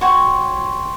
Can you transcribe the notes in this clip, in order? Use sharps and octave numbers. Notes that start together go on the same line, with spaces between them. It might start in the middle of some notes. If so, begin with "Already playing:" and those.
F#4 C#5 G5 C6 C#6